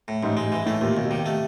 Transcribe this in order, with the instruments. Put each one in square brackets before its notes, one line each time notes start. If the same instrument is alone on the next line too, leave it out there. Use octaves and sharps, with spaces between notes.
[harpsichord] A2
[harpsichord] A1 [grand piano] G#2
[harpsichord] G#3
E3
[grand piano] A2 [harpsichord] A3
[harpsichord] D#2 [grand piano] A#2
[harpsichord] D#2 [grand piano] B2
[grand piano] C3 [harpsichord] D#3
[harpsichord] A3